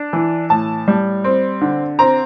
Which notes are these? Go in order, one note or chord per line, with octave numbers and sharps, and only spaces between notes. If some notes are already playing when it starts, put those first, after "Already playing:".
Already playing: D4
E3
A2 A5
G3
C4
D3
C4 A#5